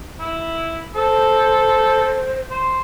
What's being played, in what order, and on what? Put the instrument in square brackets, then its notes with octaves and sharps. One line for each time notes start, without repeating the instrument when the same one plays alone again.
[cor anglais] E4
[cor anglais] A4 [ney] C5
[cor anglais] C5